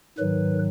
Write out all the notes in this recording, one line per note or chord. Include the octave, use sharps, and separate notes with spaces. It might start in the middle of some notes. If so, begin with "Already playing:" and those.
G#2 D#3 F#3 B4